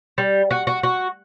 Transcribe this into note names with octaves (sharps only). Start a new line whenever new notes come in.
G3
F#4
F#4
F#4